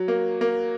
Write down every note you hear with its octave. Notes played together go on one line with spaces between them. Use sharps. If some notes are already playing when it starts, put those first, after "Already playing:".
Already playing: F#3
A#3
A#3